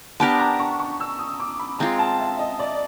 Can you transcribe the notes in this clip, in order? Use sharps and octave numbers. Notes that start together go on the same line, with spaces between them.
B3 D4 G4 A#4 A5
A#5
C#6
C#6
E6
D#6
D6
B5
G#3 C4 F4 A#5
A5
E5
D#5
D5